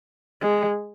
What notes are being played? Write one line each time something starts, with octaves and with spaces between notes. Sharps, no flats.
G#3